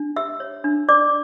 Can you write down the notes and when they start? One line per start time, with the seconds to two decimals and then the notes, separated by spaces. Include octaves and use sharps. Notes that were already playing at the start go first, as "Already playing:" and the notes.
Already playing: D4
0.16 G4 E5 E6
0.40 C#5
0.64 D4
0.89 D4 D5 D6